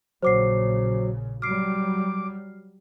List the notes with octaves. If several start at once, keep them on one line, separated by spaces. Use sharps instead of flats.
A#1 A#2 C#3 F#3 C5 D6 C7
F#3 G3 D6 F6 C7